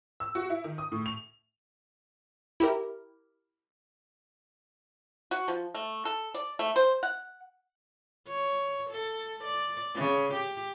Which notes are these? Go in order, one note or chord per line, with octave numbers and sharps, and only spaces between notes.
E6
F#4
E4
D#3
D#6
A2
F7
E4 G4 A#4
F#4
F3
A3
A4
D5
A3
C5
F#5
C#5
A4
D5
C#3
G4